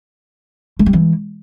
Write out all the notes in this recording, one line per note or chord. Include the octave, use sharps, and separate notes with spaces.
A3
G3
E3